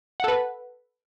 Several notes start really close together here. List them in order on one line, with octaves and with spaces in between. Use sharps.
F#5 A4 B4